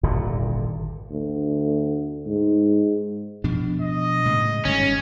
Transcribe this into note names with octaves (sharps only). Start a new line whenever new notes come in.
D#1 G#1 A#2 D3
D2
G#2
B2 F3 D4
D#5
A2 C#3 G#3
G1 D#3 G#3 C#4